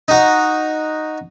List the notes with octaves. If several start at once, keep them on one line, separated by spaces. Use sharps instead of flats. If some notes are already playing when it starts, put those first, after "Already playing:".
D#4 F#4